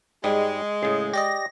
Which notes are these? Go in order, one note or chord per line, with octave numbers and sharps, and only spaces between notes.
G#2 G3 G#3
A2 C#3 G#4
G4 D5 D#5 A#6